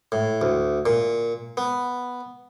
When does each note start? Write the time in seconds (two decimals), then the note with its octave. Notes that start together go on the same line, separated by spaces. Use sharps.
0.12 A2
0.41 D2
0.86 A#2
1.57 B3